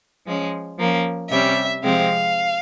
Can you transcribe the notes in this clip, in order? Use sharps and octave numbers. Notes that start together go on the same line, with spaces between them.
F3 G#3 C#4
F3 A#3 C#4
C3 G3 C#4 E5
C3 F3 G#3 C4 F5